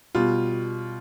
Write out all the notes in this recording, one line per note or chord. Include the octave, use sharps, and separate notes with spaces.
B2 G3 F4